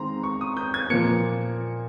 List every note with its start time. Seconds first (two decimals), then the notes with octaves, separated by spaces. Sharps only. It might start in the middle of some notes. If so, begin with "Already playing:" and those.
Already playing: D#3 G#3 C4 A#5 C6
0.23 C#6
0.41 D#6
0.57 G6
0.74 G#6
0.90 A#2 F3 A#3 C#7